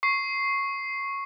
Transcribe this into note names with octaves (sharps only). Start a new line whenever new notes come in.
C#6 C7